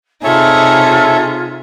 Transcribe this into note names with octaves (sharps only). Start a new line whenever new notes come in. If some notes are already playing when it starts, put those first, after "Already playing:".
C3 D#4 F4 G#4 A4 C#5 E5